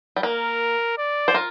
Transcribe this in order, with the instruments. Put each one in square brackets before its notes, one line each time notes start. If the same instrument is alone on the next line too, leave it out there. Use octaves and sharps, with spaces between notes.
[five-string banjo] G3
[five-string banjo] A#3 [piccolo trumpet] A#4
[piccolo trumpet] D5
[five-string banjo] C5
F4 A#4